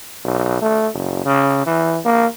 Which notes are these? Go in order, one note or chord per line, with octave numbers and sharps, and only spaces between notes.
B1
A3
F#1
C#3
E3
A#3